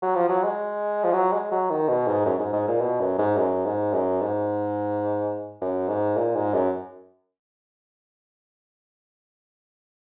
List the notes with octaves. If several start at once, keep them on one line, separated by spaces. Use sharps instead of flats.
F#3
F3
F#3
G#3
F3
F#3
G#3
F#3
D#3
B2
G#2
F#2
G#2
G#2
A#2
B2
F#2
G#2
F#2
G#2
F#2
G#2
F#2
G#2
A#2
G#2
F#2